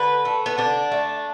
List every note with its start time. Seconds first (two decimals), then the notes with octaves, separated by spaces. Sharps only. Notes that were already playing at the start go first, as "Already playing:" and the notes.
Already playing: D3 B4
0.25 A3
0.46 B3
0.58 D3 D4
0.92 A3